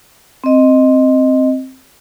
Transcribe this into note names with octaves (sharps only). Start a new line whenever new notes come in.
C4 D#5